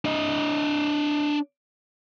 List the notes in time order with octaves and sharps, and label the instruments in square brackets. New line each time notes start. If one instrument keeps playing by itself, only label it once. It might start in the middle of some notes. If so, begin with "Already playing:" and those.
[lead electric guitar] D4 D#5